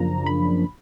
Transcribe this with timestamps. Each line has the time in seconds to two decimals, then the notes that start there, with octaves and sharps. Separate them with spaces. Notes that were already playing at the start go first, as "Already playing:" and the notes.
Already playing: F#2 C#3 F3 A#3 D4 A#5
0.26 B5